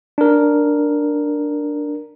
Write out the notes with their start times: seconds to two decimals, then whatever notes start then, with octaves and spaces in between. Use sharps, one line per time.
0.18 D4 A#4